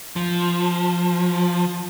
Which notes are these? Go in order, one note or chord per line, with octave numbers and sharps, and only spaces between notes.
F3